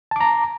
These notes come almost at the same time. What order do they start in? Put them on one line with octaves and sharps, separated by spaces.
A5 D6 A#5